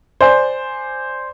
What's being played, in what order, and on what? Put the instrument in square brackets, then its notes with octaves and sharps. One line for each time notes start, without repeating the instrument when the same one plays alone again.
[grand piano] C5 D5 G#5